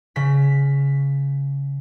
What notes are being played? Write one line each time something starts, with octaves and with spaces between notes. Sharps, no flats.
C#3 B6